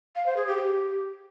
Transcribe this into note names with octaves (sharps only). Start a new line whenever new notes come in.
F5
C5
G#4
G4
G4